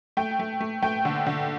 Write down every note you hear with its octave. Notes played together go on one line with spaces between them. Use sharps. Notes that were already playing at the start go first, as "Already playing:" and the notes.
A3 G5
A3
A3
A3 G5
D3
D3